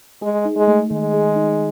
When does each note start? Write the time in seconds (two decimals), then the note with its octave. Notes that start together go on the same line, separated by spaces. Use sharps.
0.22 G#3 G#4
0.45 D#4
0.57 G#3
0.68 A3
0.91 D#3 G#3
1.14 G#4
1.36 D#4